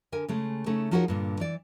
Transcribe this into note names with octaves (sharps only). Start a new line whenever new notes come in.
D3 A#4 G#5
C#3 G#3 A3
C#3 A3 C#4 D#4 A4
F3 D#4 F#4 G#4 A#4 C#5
G2 A#2 D3
E3 D5